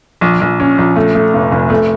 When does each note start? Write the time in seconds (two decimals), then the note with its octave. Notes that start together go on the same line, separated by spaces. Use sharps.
0.21 A#1
0.41 A#1
0.60 C#4
0.78 A#1
0.96 A3
1.15 A3
1.33 F1
1.52 F1
1.70 A3